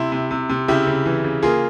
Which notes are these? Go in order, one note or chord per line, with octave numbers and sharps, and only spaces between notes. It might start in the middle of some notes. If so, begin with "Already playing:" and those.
Already playing: C3 E4
C3
C3
C3
C#3 E4 G4
C#3
E3
C#3
A#3 F4 G#4